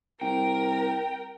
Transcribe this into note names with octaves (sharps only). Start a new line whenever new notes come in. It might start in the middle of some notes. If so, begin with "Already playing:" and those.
C2 A#4 G5